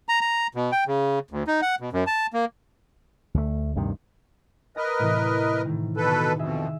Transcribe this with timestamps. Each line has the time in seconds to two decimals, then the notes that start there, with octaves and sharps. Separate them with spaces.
0.09 A#5
0.21 A#5
0.55 B2
0.72 G5
0.87 C#3
1.31 D2
1.47 D#4
1.62 F#5
1.80 B2
1.93 F#2
2.07 A5
2.33 A#3
3.34 D2 A3
3.75 D2 G2 C3 D#3
4.77 A#4 B4 D#5 A#6
4.99 A2 C3 E3
5.65 A2 D#3
5.97 B2 A4 B4
6.39 F2 B2 G#4 D#5 E5